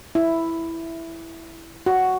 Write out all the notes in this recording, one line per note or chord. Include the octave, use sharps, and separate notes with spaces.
E4
F#4